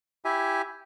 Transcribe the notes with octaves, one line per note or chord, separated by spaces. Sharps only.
E4 G4 E5 G#5